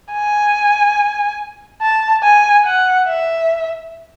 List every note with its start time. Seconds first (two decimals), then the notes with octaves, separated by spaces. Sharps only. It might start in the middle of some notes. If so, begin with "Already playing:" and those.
0.13 G#5
1.81 A5
2.23 G#5
2.65 F#5
3.08 E5